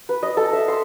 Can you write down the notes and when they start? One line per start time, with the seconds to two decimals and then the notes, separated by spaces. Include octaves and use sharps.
0.09 B4
0.23 D#5
0.37 A4
0.53 E5
0.68 C6